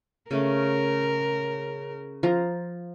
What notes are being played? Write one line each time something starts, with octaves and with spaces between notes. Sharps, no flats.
C#3 A3 C#4 A#4
F3 A#5